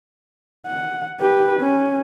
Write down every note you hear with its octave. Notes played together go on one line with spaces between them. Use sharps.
F#5
G4 B4
C#4